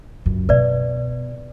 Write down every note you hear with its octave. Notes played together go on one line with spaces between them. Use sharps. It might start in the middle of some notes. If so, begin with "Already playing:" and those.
C#2 F#2
B2 B4 D5